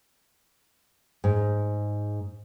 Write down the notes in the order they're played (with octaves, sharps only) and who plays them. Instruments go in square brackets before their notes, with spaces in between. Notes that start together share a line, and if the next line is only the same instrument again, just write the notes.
[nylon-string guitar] G#2